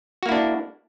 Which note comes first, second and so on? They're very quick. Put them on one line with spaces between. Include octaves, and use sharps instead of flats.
F#4 A#3 E4 D4